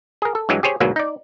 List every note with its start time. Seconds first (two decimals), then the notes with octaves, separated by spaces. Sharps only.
0.22 G#4 A#4
0.35 A4
0.49 G2 E3 F#3 G#3
0.63 G4 G#4 C5 C#5
0.80 D2 G#2 B2 F#3 A#3
0.96 D#4 D5